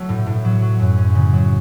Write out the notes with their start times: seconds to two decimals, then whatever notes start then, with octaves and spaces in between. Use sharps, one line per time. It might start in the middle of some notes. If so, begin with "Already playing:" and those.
Already playing: F#3 A3
0.09 A2
0.26 A2
0.44 F#3
0.62 F#3
0.80 F#2
0.97 C#4
1.15 C#3
1.33 F#3